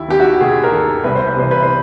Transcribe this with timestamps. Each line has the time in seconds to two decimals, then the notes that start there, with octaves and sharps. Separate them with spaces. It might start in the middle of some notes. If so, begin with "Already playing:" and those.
Already playing: D#2 E4
0.08 D#3 G4
0.20 F#4
0.40 D#2 G#4
0.64 A#4
0.72 D#3 A4
1.04 C2 B4
1.15 C5
1.28 B4
1.36 C3 E3 C5
1.51 B4
1.62 C5